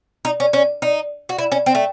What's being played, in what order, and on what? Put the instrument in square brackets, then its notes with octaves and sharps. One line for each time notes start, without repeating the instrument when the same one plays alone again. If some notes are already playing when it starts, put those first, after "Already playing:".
[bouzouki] D#4
C#4
C#4
D#4
F#4
E4
C#4
C4
A3